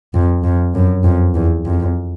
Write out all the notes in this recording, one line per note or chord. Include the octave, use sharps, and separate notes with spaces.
F2
F2
F#2
F2
E2
F2